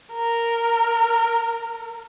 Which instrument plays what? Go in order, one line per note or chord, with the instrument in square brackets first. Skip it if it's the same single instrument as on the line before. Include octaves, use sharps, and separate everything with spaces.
[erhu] A#4